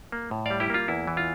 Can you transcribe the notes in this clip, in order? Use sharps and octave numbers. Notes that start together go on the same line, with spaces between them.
A#3
A2
G3 D5 F5
E4 G4
A#3 F4
E2 E4
E3
F4